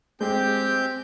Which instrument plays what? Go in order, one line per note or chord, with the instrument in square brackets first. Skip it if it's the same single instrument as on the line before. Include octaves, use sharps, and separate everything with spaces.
[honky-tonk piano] G#3 [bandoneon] C4 G6 [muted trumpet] G4